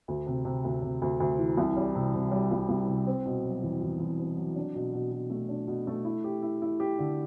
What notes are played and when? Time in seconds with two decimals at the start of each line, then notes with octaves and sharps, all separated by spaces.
0.08 D2
0.27 C3
0.45 C3
0.64 D2
0.82 C3
1.02 D2
1.20 D2
1.39 E3
1.57 C2
1.76 G3
1.95 C3
2.14 C3
2.32 G3
2.51 C2
2.69 C2
2.87 C3
3.07 C4
3.26 B2
3.44 F#3
3.63 E2
3.82 E2
4.00 E2
4.19 C4
4.37 F#3
4.56 D4
4.75 B2
4.93 B2
5.12 B2
5.30 A3
5.49 D4
5.67 B2
5.87 A3
6.05 E4
6.24 G4
6.42 E4
6.62 E4
6.80 G4
6.99 D3